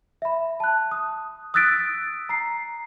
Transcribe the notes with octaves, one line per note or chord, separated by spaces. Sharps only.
E5 B5
A5 F#6
D#6
D#6 E6 F#6 A6 B6 D7
A#5 C7